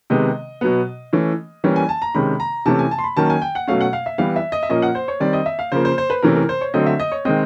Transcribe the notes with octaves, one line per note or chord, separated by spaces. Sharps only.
C3 D#3 G#3 B3 D#5
B2 F#3 B3
E3 A3 C#4
E3 G3 A#3 C#4
G#5
A5
A#5
C3 D#3 G#3 C#4 B5
A#5
C3 E3 A3 C#4 A5
G#5
A5
C6
B5
D#3 F#3 A#3 C#4 A5
G#5
G5
F#5
B2 F#3 A3 C#4 F5
F#5
F5
E5
E3 G3 B3 F5
E5
D#5
E5
A#2 F3 A#3 C#4 D#5
F#5
C5
C#5
D#3 G3 C4 D5
D#5
E5
F5
C#3 F3 A#3 C5
C5
C5
B4
C3 E3 A3 C#4 A#4
A#4
C5
C#5
D3 F#3 A3 C4 D#5
E5
D#5
C#5
D#3 G#3 C4 D#5